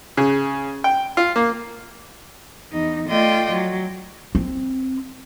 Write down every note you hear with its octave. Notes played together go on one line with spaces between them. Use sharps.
C#3
G5
F4
A#3
E2 D#4
A3 F4 D5 D#5 G5
F#3
C4